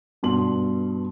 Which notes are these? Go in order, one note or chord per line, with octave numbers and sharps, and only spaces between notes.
G2 B2 C6 F#7